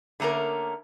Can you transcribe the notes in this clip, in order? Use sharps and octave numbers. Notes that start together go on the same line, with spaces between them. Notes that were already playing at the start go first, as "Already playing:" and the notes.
D3 A3 A#3 C#4 A#4